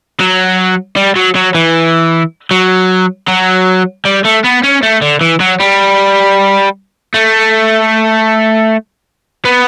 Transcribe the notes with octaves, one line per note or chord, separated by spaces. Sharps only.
F#3
G3
F#3
F#3
E3
F#3
F#3
G3
A3
B3
C#4
A3
D3
E3
F#3
G3
A3
B3